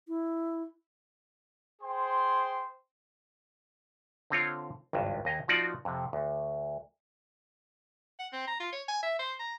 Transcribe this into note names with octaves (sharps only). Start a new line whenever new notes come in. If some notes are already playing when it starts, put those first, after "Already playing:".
E4
G#4 C5 G5 C6
D3 C4 F4 C#5
G#1 C#2 G2
D#2 D#5 G#5 A#5
F3 A#3 D#4 F4 F#4 D5
F2 C3
D2
F#5
C4
A#5
F4
C#5
G#5
E5
C5
A#5